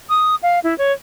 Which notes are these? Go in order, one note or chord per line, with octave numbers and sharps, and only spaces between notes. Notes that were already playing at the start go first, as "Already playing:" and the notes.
D#6
F5
E4
C#5